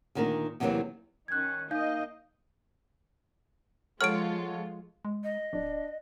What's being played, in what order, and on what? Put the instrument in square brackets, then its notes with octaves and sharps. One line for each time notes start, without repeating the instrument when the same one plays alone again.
[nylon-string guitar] D2 A#2 D#3 D4 A#4
E2 C3 E3 F#3 A#3 E4
[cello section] D#3 C#4 [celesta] F#6 G#6
[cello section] A#3 D#5 [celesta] D#4 F5 G6
[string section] F3 G#3 F4 [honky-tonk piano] A4 C#5 F#5 [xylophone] F6 D7
[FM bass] G#3
[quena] D#5
[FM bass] D1 [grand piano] D4